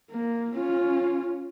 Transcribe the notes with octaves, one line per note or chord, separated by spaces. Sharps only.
A#3
C#4 F4